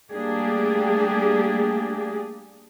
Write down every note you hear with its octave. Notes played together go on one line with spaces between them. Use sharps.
G3 A3 A#3 D4 G4 G#4